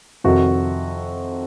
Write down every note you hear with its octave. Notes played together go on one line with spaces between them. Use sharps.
F2 C3 D#3 F#4